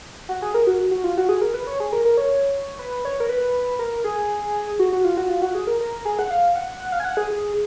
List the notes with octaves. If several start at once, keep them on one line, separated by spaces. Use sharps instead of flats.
F#4
G#4
A#4
F#4
F#4
F4
F#4
G#4
A#4
B4
C#5
G#4
A#4
A#4
C#5
B4
C#5
A#4
B4
A#4
G#4
F#4
F#4
F4
F#4
F4
F#4
G#4
A#4
A#4
G#4
F#5
F5
F#5
F#5
F5
G#5
F#5
G#4
G#4